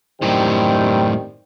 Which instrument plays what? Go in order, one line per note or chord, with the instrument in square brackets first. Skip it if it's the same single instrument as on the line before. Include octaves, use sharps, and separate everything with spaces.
[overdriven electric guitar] F#2 A2 [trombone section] D#3 G3 C4